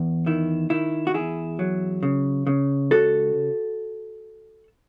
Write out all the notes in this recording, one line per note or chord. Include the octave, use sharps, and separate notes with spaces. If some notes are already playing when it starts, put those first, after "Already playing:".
Already playing: E2
D#3 E4
D#3 E4
F#4
E2 E4 G#4
F#3
C#3
C#3
C#2 F#4 A4